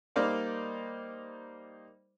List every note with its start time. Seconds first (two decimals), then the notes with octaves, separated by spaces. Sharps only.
0.16 G3 A#3 D#4 C5 D5 F5